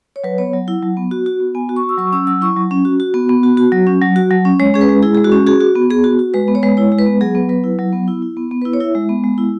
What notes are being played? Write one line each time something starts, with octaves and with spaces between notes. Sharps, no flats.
C#5
F#3 B4
B3 C#5
F#3
E4 F#5
F#3
B3
F#4
F#4
B3
B3 G#5
F#4
C#6
F#4
E6
F#3 C#6
C#4 E6
F#3 E6
E4 C#6
F#3
C#4
F#4
F#4
B3
B3
F#4
F#4
F#3
C#4
F#3
F#4
F#3
C#4
G#3 C#5
C#4 G#4
B4
G#3
E4 G#4
G#3 G#4
F#4
C#4
F#4 G#4
F#4
B3
B3 G#4
F#4
F#4
G#3 B4
B3
C#5
G#3 B4
E4 C#5
G#3
B4
B3
F#3 G#4
B3 B4
F#3 B4
E4
F#3
B3
E4
E4
B3
B3
B4
E4
C#5
E4 E5
G#3
B3
G#3
E4